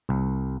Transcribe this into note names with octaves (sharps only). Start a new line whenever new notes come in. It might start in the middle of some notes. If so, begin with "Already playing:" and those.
C2